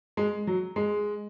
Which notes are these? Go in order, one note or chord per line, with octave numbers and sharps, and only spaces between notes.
G#3
F#3
G#3